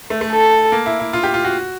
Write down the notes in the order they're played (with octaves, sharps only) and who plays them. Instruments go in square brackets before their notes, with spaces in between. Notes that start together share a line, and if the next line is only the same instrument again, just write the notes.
[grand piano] A3
A3
[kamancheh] A4
[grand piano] A#3
E4
E4
F4
G4
F4
F#4